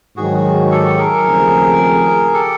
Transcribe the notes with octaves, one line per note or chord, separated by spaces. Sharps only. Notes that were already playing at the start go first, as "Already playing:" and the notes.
G#2 D#3 F#3 F#4 G#4
G4 A4
G#4 A#4
D#2 C#3 F3 A3 C4
G4 A4